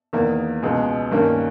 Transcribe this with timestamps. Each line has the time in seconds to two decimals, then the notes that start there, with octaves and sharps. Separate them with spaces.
0.13 E2 D#3 A#3
0.62 C#2 B2 G#3
1.11 G2 D#3 A#3 C#4